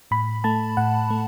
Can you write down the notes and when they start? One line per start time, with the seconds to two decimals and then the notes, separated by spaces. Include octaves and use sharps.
0.11 A2 B5
0.44 A3 A5
0.77 A2 F#5
1.10 A3